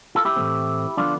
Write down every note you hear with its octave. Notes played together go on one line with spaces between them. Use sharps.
F4 A4
E4 G4
A2 E3 A3 C4
D3 F3 B3 D4 F4